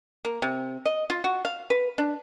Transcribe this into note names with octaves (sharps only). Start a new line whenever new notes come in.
A#3
C3
D#5
F4
F#4
F5
B4
D4